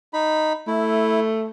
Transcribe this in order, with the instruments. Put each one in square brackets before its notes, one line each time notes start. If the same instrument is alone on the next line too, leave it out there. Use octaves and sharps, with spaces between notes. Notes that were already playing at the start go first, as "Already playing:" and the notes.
[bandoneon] D#4 B5
[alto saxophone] A3 [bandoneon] E4